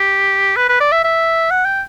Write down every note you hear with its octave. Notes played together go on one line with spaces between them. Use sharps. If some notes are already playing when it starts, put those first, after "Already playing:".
Already playing: G4
B4
B4
D5
E5
E5
F#5
G5